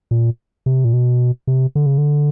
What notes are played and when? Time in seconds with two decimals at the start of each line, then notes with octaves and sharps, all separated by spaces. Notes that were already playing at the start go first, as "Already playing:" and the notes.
0.11 A#2
0.66 C3
0.85 A#2
0.93 B2
1.47 C3
1.75 D3
1.86 C#3
1.98 D3